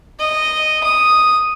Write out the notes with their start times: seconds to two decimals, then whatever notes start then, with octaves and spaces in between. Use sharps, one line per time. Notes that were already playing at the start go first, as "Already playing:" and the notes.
0.19 D#5
0.84 D#6